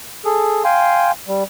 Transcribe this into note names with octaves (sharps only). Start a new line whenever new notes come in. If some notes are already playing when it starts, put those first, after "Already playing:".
G#4 A4
F5 G5 G#5 C6
G3